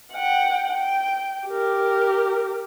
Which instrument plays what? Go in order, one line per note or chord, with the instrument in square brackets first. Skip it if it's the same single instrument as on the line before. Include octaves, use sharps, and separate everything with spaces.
[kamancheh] F#5 G5
G5
G4 A#4